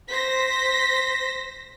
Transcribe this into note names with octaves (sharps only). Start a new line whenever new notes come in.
C5 A#6 B6